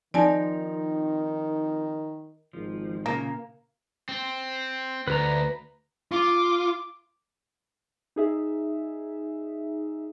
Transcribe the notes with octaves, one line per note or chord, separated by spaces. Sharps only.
D#3 F3 C4 D#4 D5 G#5 A5
G#1 F3
A#2 C#3 A#3 A#5
C4
D2 B4 A#5
F4 D6
D#4 G#4 E5